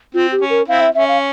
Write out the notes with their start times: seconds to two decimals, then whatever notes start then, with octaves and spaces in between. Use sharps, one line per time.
0.14 C4 F4
0.32 G4
0.41 C#4
0.50 A#4
0.68 C4 E4 F5
0.81 E5
0.95 C#4 E5
1.08 F5